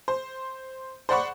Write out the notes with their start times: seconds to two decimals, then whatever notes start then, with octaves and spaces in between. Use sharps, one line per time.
0.08 C5
1.09 C5 D5 F#5 B5 C#6